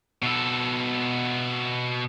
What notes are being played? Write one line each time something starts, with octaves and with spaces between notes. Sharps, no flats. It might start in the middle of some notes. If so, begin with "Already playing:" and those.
B2 A4